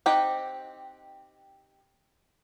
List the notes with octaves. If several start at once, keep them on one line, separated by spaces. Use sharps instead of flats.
C4 D#4 G4 F#5 G5